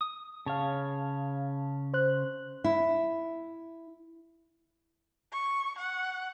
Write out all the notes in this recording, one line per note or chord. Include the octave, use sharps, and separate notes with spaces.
D#6
C#3 C#5 F5 A5
C5 F#6
E4
C#6
F#5